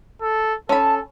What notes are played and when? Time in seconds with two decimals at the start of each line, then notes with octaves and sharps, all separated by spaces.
0.21 A4
0.69 C#4 A4 A5 B5